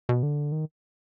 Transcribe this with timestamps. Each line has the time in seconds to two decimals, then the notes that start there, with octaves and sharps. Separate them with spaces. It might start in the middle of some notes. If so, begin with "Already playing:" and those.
0.09 B2
0.23 D3
0.52 D#3